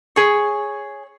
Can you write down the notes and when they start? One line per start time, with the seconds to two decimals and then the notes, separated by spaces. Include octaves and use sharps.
0.16 G#4 C#5